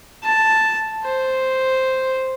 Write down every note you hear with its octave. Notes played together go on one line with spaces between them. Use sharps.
A5
C5